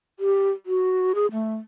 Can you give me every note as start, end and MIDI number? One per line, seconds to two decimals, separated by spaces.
0.20 0.50 67
0.66 1.13 66
1.15 1.27 68
1.32 1.55 57